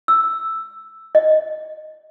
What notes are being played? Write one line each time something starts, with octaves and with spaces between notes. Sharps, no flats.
E6
D#5